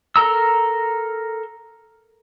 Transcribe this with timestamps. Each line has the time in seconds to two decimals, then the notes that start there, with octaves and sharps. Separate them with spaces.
0.16 A4 A#4 A#5 E6